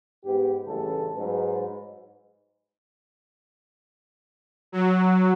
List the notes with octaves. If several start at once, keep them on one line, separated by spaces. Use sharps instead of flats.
G#2 B3 G4
A1 G2 C#3 A4
G#2 F#3 B4
F#3